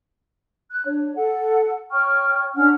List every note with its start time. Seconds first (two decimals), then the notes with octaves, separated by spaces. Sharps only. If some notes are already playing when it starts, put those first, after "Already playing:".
0.70 F#6
0.85 D4 C#5
1.16 A4 F#5
1.92 C#5 G5 C#6 F6
2.55 C#4 D4 F#5 F6